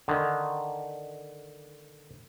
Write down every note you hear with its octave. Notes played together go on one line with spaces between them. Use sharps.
D3 D#3